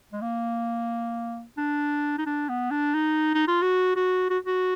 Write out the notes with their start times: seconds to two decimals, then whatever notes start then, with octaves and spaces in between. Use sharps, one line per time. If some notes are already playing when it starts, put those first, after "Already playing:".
0.13 G#3
0.22 A#3
1.58 D4
2.18 D#4
2.26 D4
2.49 B3
2.71 D4
2.94 D#4
3.34 D#4
3.48 F4
3.62 F#4
3.96 F#4
4.30 F#4
4.47 F#4